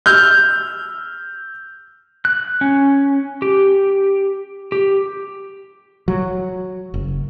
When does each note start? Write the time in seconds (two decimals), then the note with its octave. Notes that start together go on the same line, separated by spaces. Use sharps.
0.06 E6 F6 G6
2.25 F#6
2.61 C#4
3.42 G4
4.72 G4
6.08 F#3
6.94 F#1